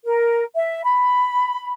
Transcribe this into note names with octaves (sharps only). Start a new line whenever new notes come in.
A#4
E5
B5